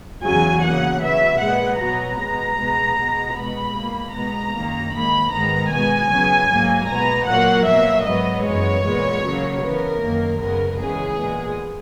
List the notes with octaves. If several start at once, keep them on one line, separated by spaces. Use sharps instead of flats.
E2 C#3 F#3 G#5
C#3 F#3 A#3 F#5
C#3 F#3 B3 E5
A#2 G#3 B3 F#5
B2 F#3 B3 A#5
B2 G#3 B3
B2 G#3 B3
B2 G#3 B3
B2 G#3 B3 B5
B2 A#3
B2 G#3 B3 A#5
F#2 D#3 A#3
G#2 D#3 A#3 B5
G#2 D#3 G#3 B3 A#5
B2 G#3 B3 G#5
C#3 F#3 B3
G#2 F#3 A#3
B2 G#3 B3 A#5
A#2 F#3 A#3 F#5
B2 F#3 A#3 E5
G#2 F#3 B3 D#5
F#2 E3 G#3 B3 C#5
A#2 G#3 B3
C#3 F#3 A#3
C#3 E3 B3 A#4
F#2 D#3 A#3
F#2 C#3 G#3 B3 A#4
C#3 E3 G#3 B3 G#4
A#2 G#3 B3